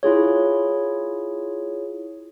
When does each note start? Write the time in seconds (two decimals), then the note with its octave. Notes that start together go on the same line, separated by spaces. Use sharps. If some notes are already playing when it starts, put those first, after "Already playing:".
0.03 E4 F4 G#4 C#5